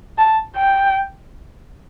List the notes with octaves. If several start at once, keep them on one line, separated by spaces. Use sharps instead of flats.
A5
G5